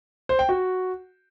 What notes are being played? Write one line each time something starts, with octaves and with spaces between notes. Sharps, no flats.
C5
G5
F#4